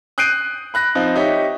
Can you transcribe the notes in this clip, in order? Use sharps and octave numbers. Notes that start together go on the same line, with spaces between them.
D#6 F#6 G6 C7 D7 D#7
B5 F#6 A#6
F3 C4 D#4
D#4 G4 C#5 E5